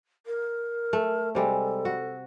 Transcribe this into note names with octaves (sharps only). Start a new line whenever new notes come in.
A#4
A3
C3 G3 G#3 A4
F#4